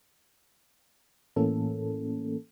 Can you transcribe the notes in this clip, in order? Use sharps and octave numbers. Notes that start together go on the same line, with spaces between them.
A2 E3 A#3 C#4 A4